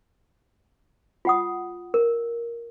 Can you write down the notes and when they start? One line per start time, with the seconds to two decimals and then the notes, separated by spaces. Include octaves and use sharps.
1.25 F4 F#5 D#6
1.94 A#4